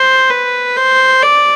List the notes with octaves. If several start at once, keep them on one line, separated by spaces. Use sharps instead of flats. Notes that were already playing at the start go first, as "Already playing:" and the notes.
Already playing: C5
B4
C5
D5